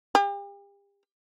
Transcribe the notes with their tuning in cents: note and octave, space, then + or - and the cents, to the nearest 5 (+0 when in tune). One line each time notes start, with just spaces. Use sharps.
G4 +40